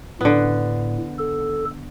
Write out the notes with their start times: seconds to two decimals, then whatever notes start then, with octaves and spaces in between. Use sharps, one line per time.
0.21 A2 D3 B3
1.19 A4